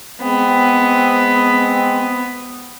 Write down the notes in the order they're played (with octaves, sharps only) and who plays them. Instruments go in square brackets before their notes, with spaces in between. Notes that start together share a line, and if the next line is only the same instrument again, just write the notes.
[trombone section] G#3 C4 [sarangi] B3